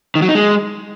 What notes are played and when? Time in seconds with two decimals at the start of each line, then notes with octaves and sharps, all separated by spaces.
0.15 D#3
0.22 F#3
0.28 D#4
0.35 G#3